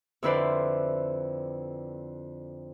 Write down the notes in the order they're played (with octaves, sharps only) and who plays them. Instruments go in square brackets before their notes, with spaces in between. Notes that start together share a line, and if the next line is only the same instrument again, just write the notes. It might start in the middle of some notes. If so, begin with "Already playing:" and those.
[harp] F2 D3 E4 B4 C5 D5